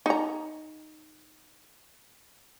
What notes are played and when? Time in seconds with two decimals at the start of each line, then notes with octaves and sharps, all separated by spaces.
0.06 D#4 A#5